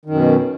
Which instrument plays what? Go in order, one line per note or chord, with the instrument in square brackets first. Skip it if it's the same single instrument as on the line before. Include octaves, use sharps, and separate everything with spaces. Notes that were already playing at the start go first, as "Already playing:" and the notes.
[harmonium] D#3
F#2
B2